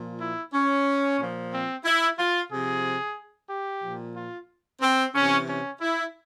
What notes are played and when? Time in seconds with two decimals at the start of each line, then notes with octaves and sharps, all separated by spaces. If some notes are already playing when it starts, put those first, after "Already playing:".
Already playing: A#2 F3
0.21 E4
0.54 C#4
1.19 A#2 F3
1.52 C4
1.85 E4
2.18 F4
2.51 C3 F3 G#4
3.50 G4
3.83 A#2 F3
4.16 F4
4.82 C4
5.15 C3 E3 C#4
5.48 C#4
5.81 E4